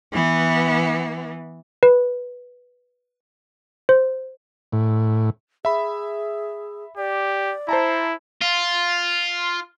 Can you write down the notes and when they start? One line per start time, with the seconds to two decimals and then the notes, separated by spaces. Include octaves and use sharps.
0.12 E3 B3
1.83 B4
3.89 C5
4.73 A2
5.65 G#4 E5 B5
6.97 G4 D5
7.69 E4 C5 A5 A#5
8.42 F4